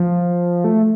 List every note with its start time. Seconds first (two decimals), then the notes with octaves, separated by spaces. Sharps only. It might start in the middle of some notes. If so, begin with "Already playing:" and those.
Already playing: F3
0.64 A3